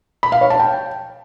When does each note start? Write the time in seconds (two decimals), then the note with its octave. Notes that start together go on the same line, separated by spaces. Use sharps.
0.23 B5
0.32 F5
0.41 C#5
0.50 A5
0.60 G5